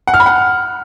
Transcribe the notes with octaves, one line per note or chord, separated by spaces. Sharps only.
F#5
F6
B5
F#5